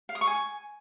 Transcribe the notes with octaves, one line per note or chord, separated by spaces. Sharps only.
F5
D#6
C#6
G#5